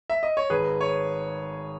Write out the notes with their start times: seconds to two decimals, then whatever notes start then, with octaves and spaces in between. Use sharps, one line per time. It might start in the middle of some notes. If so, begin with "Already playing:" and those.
0.10 E5
0.23 D#5
0.37 C#5
0.50 G#1 G#4 B4
0.81 C#5